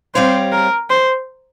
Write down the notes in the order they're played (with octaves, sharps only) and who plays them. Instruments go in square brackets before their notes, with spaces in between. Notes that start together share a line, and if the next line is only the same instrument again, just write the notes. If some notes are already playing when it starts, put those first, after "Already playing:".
[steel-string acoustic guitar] G3 C4 G4 C#5 F5 [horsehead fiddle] C5
[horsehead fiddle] A#4
C5